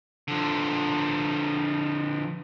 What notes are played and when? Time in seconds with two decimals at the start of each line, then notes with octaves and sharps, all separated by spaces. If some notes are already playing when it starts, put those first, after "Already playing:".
0.28 D3 F3